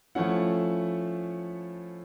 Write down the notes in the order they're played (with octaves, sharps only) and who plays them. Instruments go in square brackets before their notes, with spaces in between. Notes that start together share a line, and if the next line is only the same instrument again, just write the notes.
[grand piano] F3 A3 C#4 E4 F#5